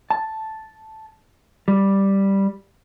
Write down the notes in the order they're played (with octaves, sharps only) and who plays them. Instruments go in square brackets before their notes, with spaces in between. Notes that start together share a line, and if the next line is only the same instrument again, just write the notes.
[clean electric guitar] A5
G3